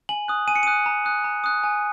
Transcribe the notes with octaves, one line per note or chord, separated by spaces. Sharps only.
G#5 F#7
D#6 F#6
G#5 D#7
C#7
D#6 F#6 D#7
A#5
D#6 F#6
A#5
D#6 F#6
G#5